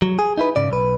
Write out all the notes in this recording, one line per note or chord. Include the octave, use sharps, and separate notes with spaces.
F#3
G#4
D#4 E4 B4
G#2 C#3 D5
B1 B4